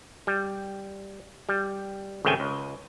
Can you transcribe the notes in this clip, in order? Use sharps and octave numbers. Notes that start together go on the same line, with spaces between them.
G3
G3
G#1 C#3 A3 G5 G#5
C#2